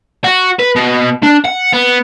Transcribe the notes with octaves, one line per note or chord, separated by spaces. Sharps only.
F#4
B4
B2
D4
F#5
B3